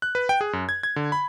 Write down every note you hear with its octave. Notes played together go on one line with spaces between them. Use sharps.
F#6
B4
G5
G#4
F#2
G#6
G#6
D3
B5